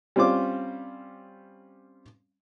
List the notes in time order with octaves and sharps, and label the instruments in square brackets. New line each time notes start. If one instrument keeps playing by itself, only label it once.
[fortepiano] G3 C4 C#4 F4 C5 D6